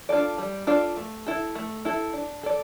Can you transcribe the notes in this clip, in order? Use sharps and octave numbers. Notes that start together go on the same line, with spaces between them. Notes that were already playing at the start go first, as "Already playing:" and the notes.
D4 F4 A4 D5
G3
D4 F4 A4 D5
A3
E4 A4
A3
E4 A4
D4
A4 D5